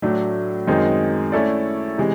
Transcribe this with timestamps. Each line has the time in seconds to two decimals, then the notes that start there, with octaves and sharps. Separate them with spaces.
0.02 A2 F#3 A3 D4
0.67 F#2 D#3 G#3 C4 D#4
1.32 A3 C#4 E4 A4 D5
1.98 C3 E3 G#3